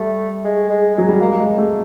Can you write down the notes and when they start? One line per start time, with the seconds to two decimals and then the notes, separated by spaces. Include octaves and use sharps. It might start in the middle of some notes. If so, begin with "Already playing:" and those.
Already playing: G3 A3
0.45 G#3
0.70 G#3
0.95 F#3 G#3
1.09 G3
1.21 G#3 A#3
1.40 G#3
1.58 A3